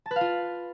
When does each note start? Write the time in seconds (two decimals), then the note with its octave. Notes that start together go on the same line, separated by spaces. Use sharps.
0.06 A5
0.11 B4
0.16 F5
0.21 F4